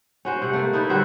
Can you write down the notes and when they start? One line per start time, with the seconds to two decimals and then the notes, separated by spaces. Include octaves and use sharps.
0.25 C#4 F#4 C5
0.42 C3 F#5
0.53 A3 A#3
0.73 D#4 E4 A4 B4
0.90 D3 G3 F#4 C5